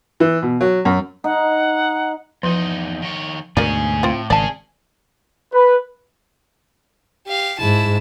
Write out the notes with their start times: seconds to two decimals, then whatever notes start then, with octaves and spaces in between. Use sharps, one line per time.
0.20 E3
0.42 B2
0.61 F#3
0.85 F#2
1.24 D#4 F#5
2.43 E2 F3 D#4
3.02 D#3 C#5
3.57 D2 G#2 B2 C#4 G#4 A#4 D5
4.03 A2 C4 F4
4.30 G#1 C#3 C#4 G#4 D5 A5
5.53 B4
7.27 G4 F5
7.59 G#2 E4 A5